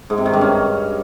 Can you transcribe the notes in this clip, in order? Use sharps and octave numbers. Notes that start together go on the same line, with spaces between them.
G#2
C3
D#3
G2
C#4